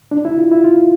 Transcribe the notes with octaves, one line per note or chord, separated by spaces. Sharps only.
D4
E4
F4
E4
F4